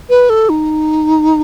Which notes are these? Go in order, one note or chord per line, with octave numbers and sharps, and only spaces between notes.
B4
A4
D#4